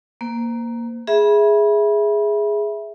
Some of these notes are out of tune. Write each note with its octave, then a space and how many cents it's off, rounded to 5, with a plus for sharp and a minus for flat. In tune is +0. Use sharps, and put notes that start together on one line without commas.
A#3 +5 C5 -25
G#4 +0 E5 +0 B5 -25